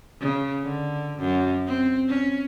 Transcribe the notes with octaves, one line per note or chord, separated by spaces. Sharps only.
C#3
D3
F#2
C4
C#4